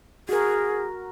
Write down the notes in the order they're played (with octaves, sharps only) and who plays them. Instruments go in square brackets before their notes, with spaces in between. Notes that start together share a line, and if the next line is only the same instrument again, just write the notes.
[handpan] F#4 A#4 [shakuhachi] G#4